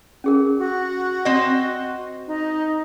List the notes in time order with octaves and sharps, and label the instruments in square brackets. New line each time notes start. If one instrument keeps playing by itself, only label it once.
[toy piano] C#4 G#4 A#4
[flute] F#4
[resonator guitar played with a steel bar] C4 D#5
[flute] D#4